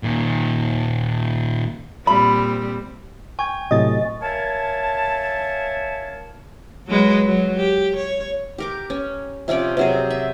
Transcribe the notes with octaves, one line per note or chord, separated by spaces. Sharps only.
A#2 D#3
A#2 G3 C4 B5
G5 G#5 C#6 G#6
A2 C3 F#3 D#5 A6
A#4 C#5 E5 F5 G#5 A5
F#3 G#3 B4
F#3
G4
C#5
G4 A#4 D6
C#4
C3 F3 C#4 D5
C3 F#3 G#4
E5